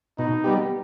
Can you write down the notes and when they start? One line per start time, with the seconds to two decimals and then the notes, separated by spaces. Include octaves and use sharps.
0.18 B2 D#4
0.44 G3 B3 G4